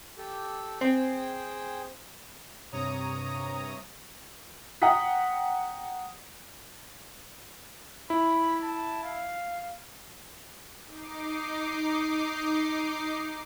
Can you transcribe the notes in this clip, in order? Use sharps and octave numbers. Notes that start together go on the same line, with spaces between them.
G4 A4
C4 G#4 C5 G5
G2 C3 C#5 A#5 D#6
F#5 G5 A#5 D#6 B6
E4 B5
A5
F5
D#4 D6 C7